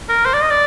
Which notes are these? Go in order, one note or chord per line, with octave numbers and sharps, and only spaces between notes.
A#4
C5
D5
D#5
D5